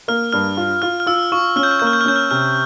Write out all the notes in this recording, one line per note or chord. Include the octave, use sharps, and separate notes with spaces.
A#3 F6
G2 F6
F4
F4 F6
F6
F4 E6
F4 C#6
C#4 F6
G6
F6
A#3 G6
F6
G6
F6
C#4 G6
F6
C3 F6